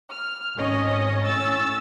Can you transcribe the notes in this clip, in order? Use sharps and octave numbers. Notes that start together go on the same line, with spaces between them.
F6
G#1 C#4 C#5 D#5
A2 C#4 E6 A6